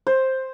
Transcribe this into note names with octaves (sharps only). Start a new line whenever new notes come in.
C5